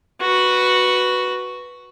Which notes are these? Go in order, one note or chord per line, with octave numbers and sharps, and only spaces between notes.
F#4 B4